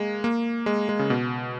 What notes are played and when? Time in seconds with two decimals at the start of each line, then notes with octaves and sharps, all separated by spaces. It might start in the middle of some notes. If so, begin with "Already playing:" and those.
Already playing: G#3 A#3
0.24 A#3
0.66 G#3
0.89 G#3
0.99 C#3
1.10 B2